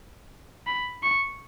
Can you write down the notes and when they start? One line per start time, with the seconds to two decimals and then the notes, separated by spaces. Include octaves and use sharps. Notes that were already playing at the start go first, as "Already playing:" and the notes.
0.67 B5
1.03 C#6